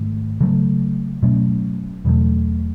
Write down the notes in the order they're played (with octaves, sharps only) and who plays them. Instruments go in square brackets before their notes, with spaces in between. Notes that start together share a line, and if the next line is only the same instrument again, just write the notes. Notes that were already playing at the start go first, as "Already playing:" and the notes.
Already playing: [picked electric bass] G#2 D#3 A3
C#3 F#3 A3
B2 F#3 A3 C#4
E2 B2 F#3 A3